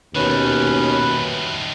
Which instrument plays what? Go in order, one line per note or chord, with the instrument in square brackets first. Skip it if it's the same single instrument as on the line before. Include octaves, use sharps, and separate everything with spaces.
[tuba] D#2 [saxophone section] B2 C#4 [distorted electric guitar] D#3 A3 [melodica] B4